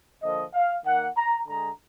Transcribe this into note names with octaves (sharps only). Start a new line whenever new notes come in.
D3 F3 A#3 D#5
F5
D#3 A#3 F#5
A#5
D3 G#3 A#5